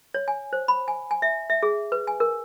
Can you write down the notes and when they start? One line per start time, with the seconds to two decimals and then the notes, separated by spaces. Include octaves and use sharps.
0.14 C#5
0.28 G#5
0.53 C5
0.68 B5
0.88 G#5
1.11 G#5
1.22 E5
1.50 E5
1.63 G#4
1.92 B4
2.07 G#5
2.20 A#4